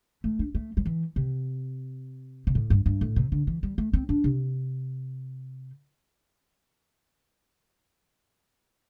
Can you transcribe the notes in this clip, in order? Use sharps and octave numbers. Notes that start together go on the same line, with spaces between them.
A3
D4
A3
G3
E3
C3
C3
A2
G2
G2
A2
C3
D3
E3
G3
A3
C4
D4
C3